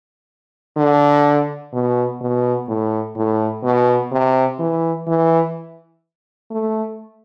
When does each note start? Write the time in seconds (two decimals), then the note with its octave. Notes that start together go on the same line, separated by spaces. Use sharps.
0.77 D3
1.73 B2
2.21 B2
2.68 A2
3.16 A2
3.63 B2
4.12 C3
4.59 E3
5.07 E3
6.51 A3